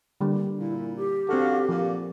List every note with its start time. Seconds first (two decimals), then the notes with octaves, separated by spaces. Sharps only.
0.21 D3 G3 A#3
0.58 A#2 E4
0.97 G4
1.29 D3 C4 F#4 A4 F5
1.69 A#2 F3